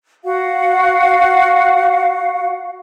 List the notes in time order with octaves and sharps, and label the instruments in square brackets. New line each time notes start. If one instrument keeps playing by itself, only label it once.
[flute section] F#4 F5 F#5